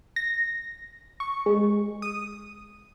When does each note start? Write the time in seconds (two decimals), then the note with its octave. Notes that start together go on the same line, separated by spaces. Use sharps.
0.16 A#6
1.20 C#6
1.46 G#3
2.02 D#6